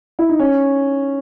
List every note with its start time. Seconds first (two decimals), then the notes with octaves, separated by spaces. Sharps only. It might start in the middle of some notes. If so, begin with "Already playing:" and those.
0.19 E4
0.29 D#4
0.39 C#4